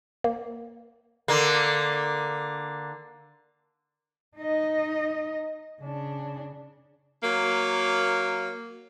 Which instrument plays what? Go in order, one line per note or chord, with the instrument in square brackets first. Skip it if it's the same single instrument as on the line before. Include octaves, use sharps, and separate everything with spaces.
[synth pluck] A#3
[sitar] D3 A#3
[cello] D#4 D#5
C#3 D4
[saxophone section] F#3 A#3